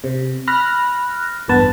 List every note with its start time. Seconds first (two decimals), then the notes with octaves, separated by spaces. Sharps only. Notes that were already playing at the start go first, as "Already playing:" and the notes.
0.04 C3
0.47 B5 F6 F#6 A#6
1.48 A1 E2 G2 B3 B4 A5